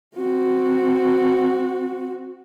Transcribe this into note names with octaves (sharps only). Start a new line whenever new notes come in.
C4 F#4